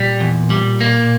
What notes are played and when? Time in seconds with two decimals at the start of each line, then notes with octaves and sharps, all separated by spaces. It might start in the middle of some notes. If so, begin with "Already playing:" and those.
Already playing: A#2 G3
0.20 E2
0.50 G3
0.81 A#3